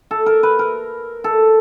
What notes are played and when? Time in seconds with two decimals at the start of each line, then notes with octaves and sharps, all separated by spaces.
0.11 A4
0.26 A#4
0.43 B4
0.59 A#4
1.24 A4